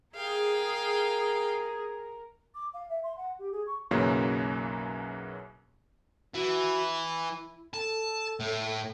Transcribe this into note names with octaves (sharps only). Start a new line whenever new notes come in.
G#4 A#4 F5 G5
D6
F5
E5
C6
F#5
G4
G#4
C#6
B1 F#2 C#3 E3 F#3 A#3
E3 F#4
E4
A4 A5
A2